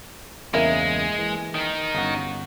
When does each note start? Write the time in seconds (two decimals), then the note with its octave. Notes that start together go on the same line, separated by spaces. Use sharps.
0.54 E2 G2 C#3 G#3 A#3 E4 E5
1.18 E3
1.54 D#3 D#4
1.94 G1 C#3 F#4